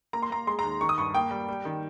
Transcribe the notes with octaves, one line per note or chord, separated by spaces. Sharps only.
A#3 A#5
C6
A#3 A#5
G#3 C6
A#5
D#2
D#3 C#6
D#6
G2 C#6
A#3 G5
G3
G3
D#3